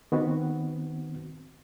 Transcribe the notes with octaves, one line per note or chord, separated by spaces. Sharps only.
D#3 B3 C4 F#4